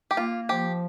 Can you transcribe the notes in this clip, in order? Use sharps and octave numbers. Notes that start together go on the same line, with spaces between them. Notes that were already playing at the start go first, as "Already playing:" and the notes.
G4
A#3 F4
F3 G4